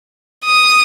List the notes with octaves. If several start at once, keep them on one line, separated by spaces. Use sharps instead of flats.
D#6